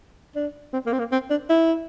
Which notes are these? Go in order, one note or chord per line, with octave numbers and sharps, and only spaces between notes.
D4
C4
A#3
C4
A#3
C4
D4
E4